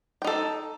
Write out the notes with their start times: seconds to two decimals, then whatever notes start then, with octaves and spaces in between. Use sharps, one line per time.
0.22 G5
0.24 D#4
0.27 A4